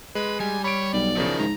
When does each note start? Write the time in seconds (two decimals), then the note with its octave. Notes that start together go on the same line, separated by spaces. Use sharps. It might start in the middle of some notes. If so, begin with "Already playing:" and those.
0.15 G#3 B4
0.40 G3 G#5
0.64 C#5 B5 D7
0.93 B1 D5
1.17 C#3 F3 D#4 E4 A#4
1.39 G#2 A#5